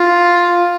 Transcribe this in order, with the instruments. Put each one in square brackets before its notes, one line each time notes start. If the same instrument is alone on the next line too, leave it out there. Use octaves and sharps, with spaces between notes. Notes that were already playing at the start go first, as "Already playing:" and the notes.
Already playing: [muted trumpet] F4